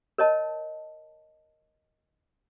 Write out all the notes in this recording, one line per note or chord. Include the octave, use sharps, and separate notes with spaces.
A#4 C#5 D#5 A5